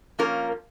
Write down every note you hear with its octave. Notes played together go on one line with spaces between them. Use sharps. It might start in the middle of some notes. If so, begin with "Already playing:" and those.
F3 A#3 C#4 F4 A#4